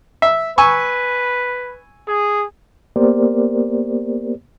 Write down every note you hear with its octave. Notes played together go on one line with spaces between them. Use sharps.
E5
B4 G#5 C#6 E6
G#4
A#3 B3 G4 A#4 C5 D5